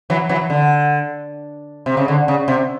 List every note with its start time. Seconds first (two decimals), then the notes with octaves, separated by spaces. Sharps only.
0.10 E3 F#3
0.29 E3 F#3
0.50 D3
1.86 C3
1.97 C#3
2.08 D3
2.28 C#3
2.48 C3